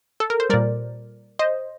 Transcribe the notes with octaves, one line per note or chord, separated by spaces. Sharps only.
A4
A#4
C5
A#2 G3 A#4 D5
C5 D#5